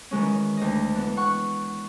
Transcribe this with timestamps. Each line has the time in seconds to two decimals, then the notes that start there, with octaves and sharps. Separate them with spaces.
0.11 D#3 E3 G#3 C#4
0.57 D2 D#5
0.95 E3 B3
1.17 F#5 C#6